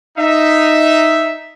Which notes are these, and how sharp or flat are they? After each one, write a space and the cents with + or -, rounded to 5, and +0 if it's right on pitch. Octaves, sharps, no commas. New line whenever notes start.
D#4 +0 E5 +0